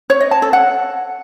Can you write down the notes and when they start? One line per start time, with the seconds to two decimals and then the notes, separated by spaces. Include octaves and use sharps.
0.10 C#5
0.21 D#5
0.31 A5
0.42 A4
0.53 F#5